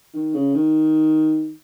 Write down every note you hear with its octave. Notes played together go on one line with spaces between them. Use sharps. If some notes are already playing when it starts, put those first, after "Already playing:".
D#3
C#3
D#3